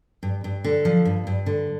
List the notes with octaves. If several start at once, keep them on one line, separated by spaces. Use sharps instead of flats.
G2
G2
D3
F3
G2
G2
D3